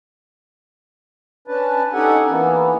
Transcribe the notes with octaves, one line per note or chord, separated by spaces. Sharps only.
C#4 D4 B4 A5
C#4 D#4 G4 A4 F#5 G#5
E3 A#3 B3